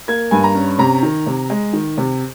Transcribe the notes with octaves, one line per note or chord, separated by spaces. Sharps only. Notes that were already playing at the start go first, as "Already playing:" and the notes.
A#3 G#6
G2 G#5
A#5
C#4
C3 A#5
D#3
C3
G#3
D#3
C3